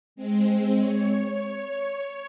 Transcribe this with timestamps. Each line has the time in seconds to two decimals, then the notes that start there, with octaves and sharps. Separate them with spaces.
0.16 G#3 C4
0.79 C#5